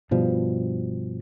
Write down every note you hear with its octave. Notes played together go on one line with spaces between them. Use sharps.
G2 B2 F3 G3